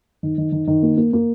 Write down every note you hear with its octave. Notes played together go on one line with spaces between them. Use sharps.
D#3
D#3
D#3
D#3
A#3
A#3
A#3